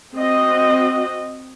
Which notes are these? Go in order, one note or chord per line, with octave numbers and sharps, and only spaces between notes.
C4 F#4 D#5